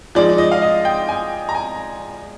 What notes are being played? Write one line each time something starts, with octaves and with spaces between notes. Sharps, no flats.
F3 G#3 D#4 D5
D#5
F5
D#5
G5
G#5
A#5
G#5